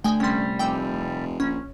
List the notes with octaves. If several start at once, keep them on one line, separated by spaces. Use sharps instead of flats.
D3 A3 G5 G#5 D#6
C2 G3 C#4 C6
F1 G5 D6 E6
A#1 C#4